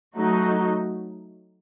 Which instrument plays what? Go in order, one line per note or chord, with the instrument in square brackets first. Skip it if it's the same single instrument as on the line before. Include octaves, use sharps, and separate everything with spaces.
[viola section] F#3 A3 D#4 F#4